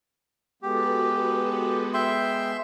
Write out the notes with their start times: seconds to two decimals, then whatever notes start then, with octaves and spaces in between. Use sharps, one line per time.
0.63 G#3 B3 F#4 G4 A4 B4
1.94 E5 G5 C6